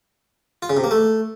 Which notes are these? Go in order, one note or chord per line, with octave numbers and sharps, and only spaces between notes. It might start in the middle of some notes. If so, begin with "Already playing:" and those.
F4
C#3
C3
A#3
A3